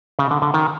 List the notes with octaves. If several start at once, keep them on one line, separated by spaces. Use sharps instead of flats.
C#3
D3
D3
D#3